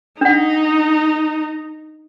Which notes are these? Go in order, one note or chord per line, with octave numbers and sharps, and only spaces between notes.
D4 D#4 F#5